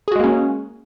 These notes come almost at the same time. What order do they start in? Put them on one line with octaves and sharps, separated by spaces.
G#4 F#4 G#3 A#3 C#4